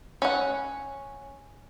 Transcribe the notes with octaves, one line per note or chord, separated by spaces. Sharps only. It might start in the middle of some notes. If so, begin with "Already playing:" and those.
C#4 F#5